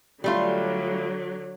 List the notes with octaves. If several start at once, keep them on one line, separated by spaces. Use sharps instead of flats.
D3 F#3 G3 A3 F4